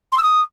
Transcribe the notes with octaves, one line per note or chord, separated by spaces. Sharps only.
C6
E6
D#6